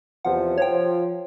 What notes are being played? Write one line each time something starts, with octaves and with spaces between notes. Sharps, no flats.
E2 C3 F3 F#5
F3 C#5 G5